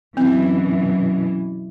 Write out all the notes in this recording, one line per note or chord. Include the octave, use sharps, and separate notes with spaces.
F#2 B2 E3 C4